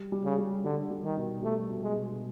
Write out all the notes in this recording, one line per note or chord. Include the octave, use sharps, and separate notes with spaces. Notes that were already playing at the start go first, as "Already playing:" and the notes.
Already playing: G3
G3
C#3
G3
D3 G3
G3
D#3
B2
G3 A3
B2
G#3
B2